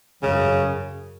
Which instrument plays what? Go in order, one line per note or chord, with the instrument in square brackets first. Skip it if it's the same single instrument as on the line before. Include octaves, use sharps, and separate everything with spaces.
[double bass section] F#2 [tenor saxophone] C#3